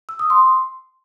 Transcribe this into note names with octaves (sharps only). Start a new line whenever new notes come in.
E6
D#6
C6